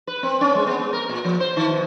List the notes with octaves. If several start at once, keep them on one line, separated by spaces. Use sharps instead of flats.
B4
C4
C#4
G#3
B3
B3
A#4
A#2
F3
C5
D#3
B2